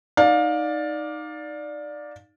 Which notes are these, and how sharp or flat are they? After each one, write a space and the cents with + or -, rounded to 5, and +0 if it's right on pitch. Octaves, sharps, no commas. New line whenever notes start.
D#4 -5 D5 +0 F5 +25